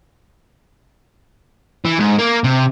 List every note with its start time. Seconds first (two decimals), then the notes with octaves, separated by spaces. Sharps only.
1.85 E3
2.00 G#2
2.19 A#3
2.44 C3